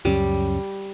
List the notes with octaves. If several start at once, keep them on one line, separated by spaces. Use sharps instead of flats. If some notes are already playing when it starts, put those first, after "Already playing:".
C#2 F#2 G3 C#4